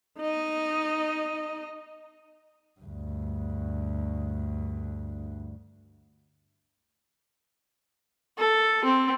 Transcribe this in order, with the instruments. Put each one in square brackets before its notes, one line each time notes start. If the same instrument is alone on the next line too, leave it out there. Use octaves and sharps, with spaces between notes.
[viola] D#4 D#5
[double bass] D2 G2
[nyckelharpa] A4
C4